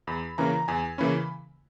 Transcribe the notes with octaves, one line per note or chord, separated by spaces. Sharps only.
E2 B5
C#3 E3 A#3 C#4 A#5
E2 G#5
C#3 E3 A#3 C#4 B5